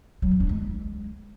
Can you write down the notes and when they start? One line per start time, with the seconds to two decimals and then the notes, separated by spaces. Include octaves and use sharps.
0.22 F#3
0.31 E3
0.40 D4
0.49 G#3